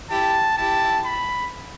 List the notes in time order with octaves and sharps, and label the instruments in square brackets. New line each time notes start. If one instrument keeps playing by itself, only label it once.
[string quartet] E4 G4 [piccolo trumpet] A5
[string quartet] E4 G4 [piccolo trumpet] A5
[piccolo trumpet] B5